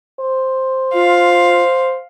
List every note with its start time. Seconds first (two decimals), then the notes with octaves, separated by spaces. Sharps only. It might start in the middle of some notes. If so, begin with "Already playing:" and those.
0.20 C5
0.94 F4 F5